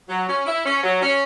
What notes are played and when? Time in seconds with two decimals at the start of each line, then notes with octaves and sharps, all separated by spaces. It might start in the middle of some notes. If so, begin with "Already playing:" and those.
0.08 F#3
0.27 C#4
0.46 E4
0.65 C#4
0.83 F#3
1.01 C#4